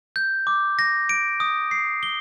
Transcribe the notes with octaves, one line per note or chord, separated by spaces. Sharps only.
G6
D6
A#6
D7
D#6
C7
G7